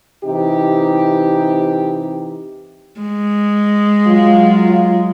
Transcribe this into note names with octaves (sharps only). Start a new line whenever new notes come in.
C3 E3 D#4 G4
G#3
F#3 F4